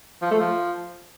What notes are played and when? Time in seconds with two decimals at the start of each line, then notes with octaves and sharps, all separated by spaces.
0.22 F3
0.31 A3
0.40 F3